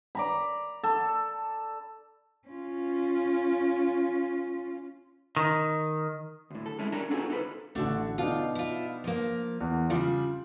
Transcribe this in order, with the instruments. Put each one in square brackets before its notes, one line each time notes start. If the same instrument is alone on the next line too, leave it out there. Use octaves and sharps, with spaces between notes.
[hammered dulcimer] D5 A#5 B5
A4
[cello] C#4 F4
[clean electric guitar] D#3
[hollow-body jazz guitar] D2 A2
A4
G#3 A3 C#4 E4
C#4 D4 G4 A4 A#4 A#5
B3 D#4 F4 F#4 G#4 A4
D#4 A4 B4 C5
[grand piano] A1 D3 [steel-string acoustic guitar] A3 D4 F#4
[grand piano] B2 D4 D#4 [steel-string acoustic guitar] F4 F5
[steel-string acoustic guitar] E4 F4
F3 A#3
[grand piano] E2
[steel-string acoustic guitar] C#3 G3 D4 [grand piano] F4